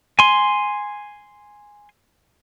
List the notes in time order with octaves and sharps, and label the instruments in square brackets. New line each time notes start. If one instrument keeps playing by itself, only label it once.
[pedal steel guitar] G#5 C6